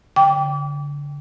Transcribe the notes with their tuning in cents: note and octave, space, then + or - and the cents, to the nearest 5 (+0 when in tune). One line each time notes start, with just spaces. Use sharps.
D3 -30 G5 +0 D6 -30